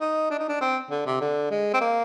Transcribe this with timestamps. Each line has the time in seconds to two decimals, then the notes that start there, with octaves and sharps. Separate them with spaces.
0.01 D#4
0.31 D4
0.39 D#4
0.49 D4
0.61 C4
0.90 D3
1.06 C3
1.21 D3
1.51 G#3
1.74 C4
1.81 A#3